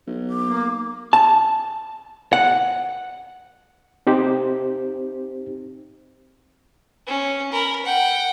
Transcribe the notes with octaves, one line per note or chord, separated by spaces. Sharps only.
B1
D6
A#3
A5
F#5
C4 D#4 G4 C5
C#4
A#4 B5
F#5 G5